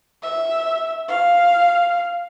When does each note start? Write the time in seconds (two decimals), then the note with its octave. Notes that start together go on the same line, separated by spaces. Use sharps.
0.23 E5
1.09 F5